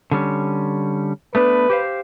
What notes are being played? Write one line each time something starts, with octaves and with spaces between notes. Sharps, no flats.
D3 G3 C#4
A3 B3 D4 B4
G4 C5 F5